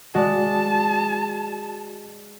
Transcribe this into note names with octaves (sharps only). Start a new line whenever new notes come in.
G#3 F#4 D5 A5